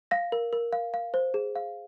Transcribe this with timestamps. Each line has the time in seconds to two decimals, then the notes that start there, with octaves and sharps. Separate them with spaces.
0.11 F5 A#6
0.32 A#4
0.53 A#4
0.73 F5
0.94 F5
1.14 C5
1.34 G#4
1.56 F5